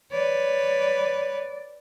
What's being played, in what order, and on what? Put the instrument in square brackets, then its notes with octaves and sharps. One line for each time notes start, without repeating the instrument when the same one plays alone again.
[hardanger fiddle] B4 C#5 [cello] D5